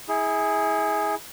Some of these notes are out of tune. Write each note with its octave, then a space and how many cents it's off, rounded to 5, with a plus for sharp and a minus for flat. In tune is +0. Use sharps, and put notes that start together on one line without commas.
E4 -30 G#4 +0